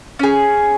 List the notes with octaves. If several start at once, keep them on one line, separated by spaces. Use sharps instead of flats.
C#4 G#4